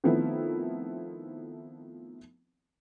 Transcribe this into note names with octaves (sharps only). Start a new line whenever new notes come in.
D#3 F3 A3 B3 C4 E4